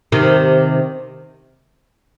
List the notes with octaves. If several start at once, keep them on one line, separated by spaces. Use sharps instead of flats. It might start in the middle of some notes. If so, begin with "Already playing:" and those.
C3 D#3